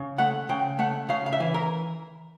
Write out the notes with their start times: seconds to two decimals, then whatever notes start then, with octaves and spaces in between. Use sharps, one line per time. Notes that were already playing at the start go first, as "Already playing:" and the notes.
Already playing: C#3
0.18 A3 F#5
0.49 C#3 G5
0.79 A3 F#5
1.09 C#3 F5
1.26 F5
1.33 E5
1.40 E3
1.54 A#4